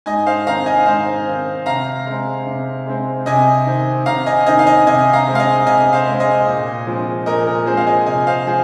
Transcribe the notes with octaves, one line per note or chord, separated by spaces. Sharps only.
G#2 D#5 G#5
C5 F5
D#3 C4 F5 A#5
D#5 G#5
G#2 C5 F5
D#3 C4
C3 F5 A#5
G#3 C4
C3
G#3 C4
C3 D#5 G#5
D#3 C4
C3 F5 A#5
D#5 G#5
D#3 C4 D#5 G#5
F5
D#5 G#5
C3 D#5 G#5
F5 A#5
G#3 C4
F5
D#5 G#5
C3 D#5 G#5
C5 F5
G#3 C4
D#5 G#5
A#2
F3 G#3 C4
A#2 A#4 D#5
A#4
F3 G#3 C4 G#4 C5
F5
D#5 G#5
C3 D#5 G#5
C5 F5
F3 G#4 C5